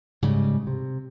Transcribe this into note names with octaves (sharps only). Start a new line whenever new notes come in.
G#2 C#3 G3
C3